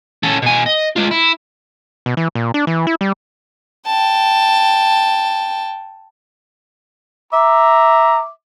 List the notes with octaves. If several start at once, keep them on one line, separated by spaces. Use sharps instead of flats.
C#4 A4
B2 G#5
D#5
G#3 F4
E4
B2
E3
A#2
D4
E3
E4
G3
G5 A5
E5 A#5 D6